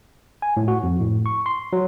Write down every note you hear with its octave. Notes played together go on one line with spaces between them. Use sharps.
G#5
A2
F#4
F2
A2
C#6
C6
F#3